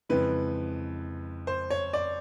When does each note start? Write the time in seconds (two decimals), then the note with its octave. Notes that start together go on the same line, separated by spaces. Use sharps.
0.09 F2 C#3 E3 G#3 B4
1.47 C5
1.70 C#5
1.93 D5